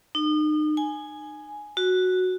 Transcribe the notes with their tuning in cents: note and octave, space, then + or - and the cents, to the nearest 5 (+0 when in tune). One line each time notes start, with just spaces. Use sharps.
D#4 -35
G#5 +5
F#4 -5